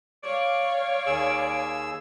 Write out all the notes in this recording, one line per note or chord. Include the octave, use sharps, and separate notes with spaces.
C#5 D5 F5
D#2 G#4 E6